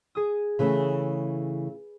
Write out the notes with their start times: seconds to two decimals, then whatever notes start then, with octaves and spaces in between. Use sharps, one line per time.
0.15 G#4 D#6
0.59 C#3 E3 A3 B4 B5